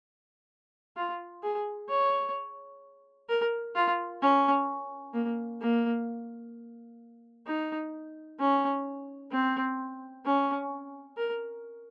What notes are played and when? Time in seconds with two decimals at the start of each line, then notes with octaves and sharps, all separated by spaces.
0.97 F4
1.43 G#4
1.89 C#5
3.29 A#4
3.75 F4
4.22 C#4
5.14 A#3
5.60 A#3
7.46 D#4
8.39 C#4
9.31 C4
10.25 C#4
11.17 A#4